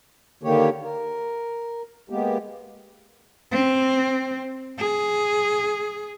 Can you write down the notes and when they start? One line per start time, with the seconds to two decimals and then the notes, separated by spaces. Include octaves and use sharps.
0.43 D3 D#3 A#3 G4 C#5
0.83 A#4
2.10 G#3 A#3 B3 G4
3.52 C4
4.78 G#4